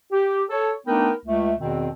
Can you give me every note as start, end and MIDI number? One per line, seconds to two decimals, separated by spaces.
0.12 0.44 67
0.50 0.72 69
0.50 0.72 73
0.86 1.11 57
0.86 1.11 59
0.86 1.11 62
0.86 1.11 63
0.86 1.11 70
0.86 1.11 79
1.26 1.54 37
1.26 1.54 57
1.59 1.89 40
1.59 1.89 47
1.59 1.89 51
1.59 1.89 60